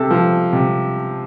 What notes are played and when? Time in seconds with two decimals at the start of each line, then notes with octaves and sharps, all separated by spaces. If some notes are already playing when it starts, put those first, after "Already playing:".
Already playing: C3 A4
0.10 F3
0.53 C3